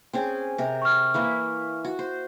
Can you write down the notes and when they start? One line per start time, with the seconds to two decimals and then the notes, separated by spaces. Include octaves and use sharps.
0.13 C4 C#4 G#4
0.58 C3 A#4
0.82 C#6 F6
1.14 E3 A#3 E4
1.85 F#4
1.99 C5